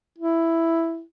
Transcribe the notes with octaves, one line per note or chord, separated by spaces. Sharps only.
E4